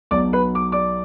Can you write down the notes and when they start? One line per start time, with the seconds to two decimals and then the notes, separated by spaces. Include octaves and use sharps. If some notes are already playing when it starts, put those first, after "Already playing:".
0.11 B1 B2 F#3 D5 D6
0.33 B4 B5
0.55 D6
0.72 D5 D6